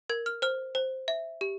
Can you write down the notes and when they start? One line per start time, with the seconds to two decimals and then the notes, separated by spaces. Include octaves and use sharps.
0.10 A#4 G#6
0.26 F6
0.42 C5 F6
0.75 C5
1.08 E5
1.41 G4